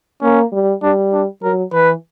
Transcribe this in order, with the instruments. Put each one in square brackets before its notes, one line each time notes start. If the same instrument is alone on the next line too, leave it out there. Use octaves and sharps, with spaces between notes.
[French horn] A#3 [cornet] C#4
[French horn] G3
[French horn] G3 [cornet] D4
[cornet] D4
[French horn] F#3 [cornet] A#4
[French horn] E3 [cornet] B4